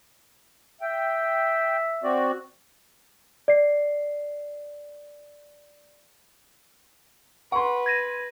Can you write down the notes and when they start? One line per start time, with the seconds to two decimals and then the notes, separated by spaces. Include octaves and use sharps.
0.81 E5 G5
2.04 C4 F#4 D5
3.48 D5 C7
7.52 B4 F#5 C6 C#6
7.86 G#6 A#6 D#7